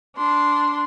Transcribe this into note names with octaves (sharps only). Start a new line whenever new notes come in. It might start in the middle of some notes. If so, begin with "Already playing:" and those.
D4 C6